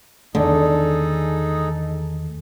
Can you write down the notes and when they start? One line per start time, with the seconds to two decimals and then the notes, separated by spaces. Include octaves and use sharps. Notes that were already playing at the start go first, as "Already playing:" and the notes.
0.35 E2 D3 D#3 A3 D#4 G#4 A4